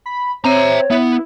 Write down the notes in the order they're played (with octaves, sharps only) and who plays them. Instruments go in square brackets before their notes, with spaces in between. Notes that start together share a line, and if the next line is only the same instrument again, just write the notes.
[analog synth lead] B5
[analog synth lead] C4 [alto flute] C#5 [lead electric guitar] E5 A#5
[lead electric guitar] B3 [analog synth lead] E4